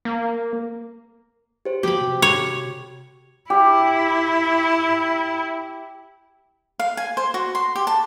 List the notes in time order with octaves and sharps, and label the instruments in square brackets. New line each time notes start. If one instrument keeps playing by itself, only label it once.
[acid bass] A#3
[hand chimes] G4 C5
[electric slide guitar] F3 A#3 B4 [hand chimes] F#4 [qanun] G4 B5
[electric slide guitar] C3
[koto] C#5
[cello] E4 [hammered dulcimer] G4
[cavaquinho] F5
G#5
C5
F#4
C6
G4
A5